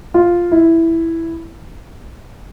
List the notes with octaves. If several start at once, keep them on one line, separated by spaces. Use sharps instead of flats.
F4
E4